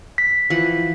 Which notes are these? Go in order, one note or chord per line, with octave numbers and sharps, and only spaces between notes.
B6
E3 F3 F#5